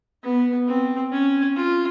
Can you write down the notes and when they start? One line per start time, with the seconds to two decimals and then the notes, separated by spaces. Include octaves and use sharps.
0.23 B3
0.68 C4
1.12 C#4
1.56 F4